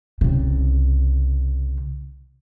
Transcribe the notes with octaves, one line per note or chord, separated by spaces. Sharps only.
C2 C#3